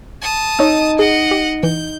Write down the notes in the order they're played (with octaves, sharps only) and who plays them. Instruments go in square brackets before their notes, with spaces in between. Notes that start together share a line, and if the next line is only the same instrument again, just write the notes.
[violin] A5 D#6
[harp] D#4 [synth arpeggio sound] C#5 E6
[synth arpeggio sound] G#4 [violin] D#5 F#5
[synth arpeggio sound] G4
[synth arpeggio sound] E3 [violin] G6